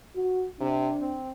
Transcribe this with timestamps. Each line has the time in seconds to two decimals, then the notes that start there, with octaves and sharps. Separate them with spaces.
0.17 F#4
0.60 C3 D4
1.00 C4